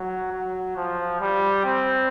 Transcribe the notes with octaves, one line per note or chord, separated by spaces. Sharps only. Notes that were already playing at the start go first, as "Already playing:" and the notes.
Already playing: F#3
F#3
F3
G3
C4